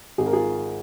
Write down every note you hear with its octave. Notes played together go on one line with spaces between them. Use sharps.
G#1 G#4
A#4
F4 G#4